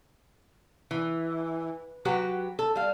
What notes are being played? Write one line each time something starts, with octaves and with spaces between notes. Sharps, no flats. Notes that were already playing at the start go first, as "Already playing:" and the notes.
E3
F#3 F#4 G4 B4
A4
G3 F5